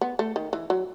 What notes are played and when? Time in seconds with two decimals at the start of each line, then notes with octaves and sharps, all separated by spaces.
0.01 B3
0.19 A3
0.36 D#3
0.53 E3
0.70 F#3